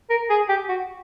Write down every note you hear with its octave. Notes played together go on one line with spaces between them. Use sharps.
A#4
G#4
G4
F#4